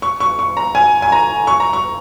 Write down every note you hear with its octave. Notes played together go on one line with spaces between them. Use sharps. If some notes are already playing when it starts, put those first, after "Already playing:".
C#6
C#6
C#6
A#5
G#5
G#5
A#5
C#6
A#5
C#6